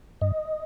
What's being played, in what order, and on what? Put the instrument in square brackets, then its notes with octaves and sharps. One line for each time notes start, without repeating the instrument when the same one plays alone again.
[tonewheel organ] G2 D#5